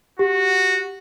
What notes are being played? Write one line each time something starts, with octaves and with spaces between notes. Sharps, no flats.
F#4 G4